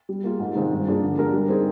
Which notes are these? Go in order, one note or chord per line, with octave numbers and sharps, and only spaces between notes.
G3
A#3 F4 G#4
G#2
D#3 G#3 C4 F4
G2
F3 A#3 D4 G#4
D3
G#3 D4 G4 A#4
G3
C4 D#4 G#4